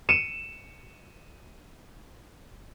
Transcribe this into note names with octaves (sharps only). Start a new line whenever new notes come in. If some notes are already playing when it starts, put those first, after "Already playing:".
C#7 D#7 E7